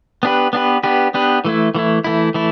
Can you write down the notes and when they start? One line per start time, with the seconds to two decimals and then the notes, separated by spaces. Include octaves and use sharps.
0.23 B3 D4 G4 B4
0.53 B3 D4 G4 B4
0.83 B3 D4 G4 B4
1.14 B3 D4 G4 B4
1.45 E3 A3 E4
1.75 E3 A3 E4
2.04 E3 A3 E4
2.34 E3 A3 E4